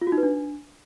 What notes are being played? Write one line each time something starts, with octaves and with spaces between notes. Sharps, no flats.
F4
F#4
D#4
B4
D4